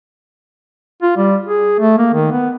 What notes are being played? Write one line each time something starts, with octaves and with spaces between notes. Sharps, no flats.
F4
G3
G#4
A3
A#3
D#3
B3